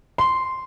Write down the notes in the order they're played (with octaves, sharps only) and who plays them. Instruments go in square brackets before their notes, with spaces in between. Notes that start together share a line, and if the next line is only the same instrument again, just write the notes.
[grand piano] C6